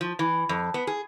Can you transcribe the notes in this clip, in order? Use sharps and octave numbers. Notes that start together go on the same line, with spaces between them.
F3
E3
F2
B3
G#4